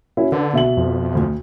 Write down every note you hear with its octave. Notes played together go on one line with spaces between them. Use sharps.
C#4 E4 F#4
D3 B4
B2 E5 F#7
F2
D2